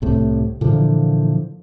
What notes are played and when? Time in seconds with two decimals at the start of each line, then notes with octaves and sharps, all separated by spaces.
0.02 C2 A2 C3
0.61 A#2 D3 E3 F3